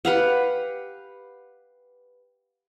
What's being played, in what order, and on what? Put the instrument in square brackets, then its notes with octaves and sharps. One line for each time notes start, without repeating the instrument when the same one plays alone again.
[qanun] G4 B4 F5 F#5